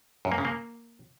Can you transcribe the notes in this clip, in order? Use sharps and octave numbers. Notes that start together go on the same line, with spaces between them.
F#2
A#3
C#3
A#3